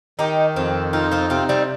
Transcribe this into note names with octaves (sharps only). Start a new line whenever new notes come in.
D#3 D#4 G4
F2 C4 F4
C4 D#4 F4
C4 F4
C3 C4 F4
G3 C4